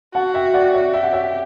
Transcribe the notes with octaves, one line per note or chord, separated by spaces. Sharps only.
F#4 F#5 A5
E5 G5
D5 F#5
C#5 E5
G4 E5
F#5
C#5 E5